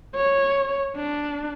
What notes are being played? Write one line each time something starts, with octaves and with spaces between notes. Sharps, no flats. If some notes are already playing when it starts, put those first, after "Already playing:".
C#5
D4